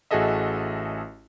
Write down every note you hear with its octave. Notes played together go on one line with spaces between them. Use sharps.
A1 F#4 G#4 A4 D#5 E5